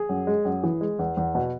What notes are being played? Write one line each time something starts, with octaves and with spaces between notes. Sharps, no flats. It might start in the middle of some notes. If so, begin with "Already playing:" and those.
Already playing: G#4
F#2
G#3
F#2
E3
G#3
E2
E2
B2